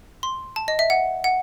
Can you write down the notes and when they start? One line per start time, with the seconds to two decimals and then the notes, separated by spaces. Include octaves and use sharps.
0.23 C6
0.56 A5
0.68 D#5
0.79 E5
0.90 F#5
1.24 F#5